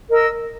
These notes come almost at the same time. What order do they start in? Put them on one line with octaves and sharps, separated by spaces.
A#4 D#5 E6